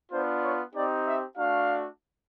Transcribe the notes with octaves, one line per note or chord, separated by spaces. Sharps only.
B3 D4 F4 C5
C#5
C4 D#4 G4 D5
E5
A3 D4 F#4 F5